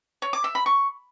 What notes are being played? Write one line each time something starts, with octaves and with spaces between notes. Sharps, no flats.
C#5
D6
E5
B5
C#6